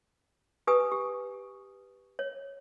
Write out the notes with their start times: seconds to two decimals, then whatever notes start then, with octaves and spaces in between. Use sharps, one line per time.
0.67 G4 B4 G#5 D#6
0.92 G4
2.19 C#5